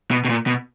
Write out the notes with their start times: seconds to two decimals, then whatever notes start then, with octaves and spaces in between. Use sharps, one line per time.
0.11 B2
0.25 B2
0.29 A#2
0.47 B2